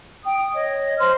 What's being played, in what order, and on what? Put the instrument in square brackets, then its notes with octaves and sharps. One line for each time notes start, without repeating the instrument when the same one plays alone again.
[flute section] G5 D#6
D#6
C#5 D#5
C5 C6 F6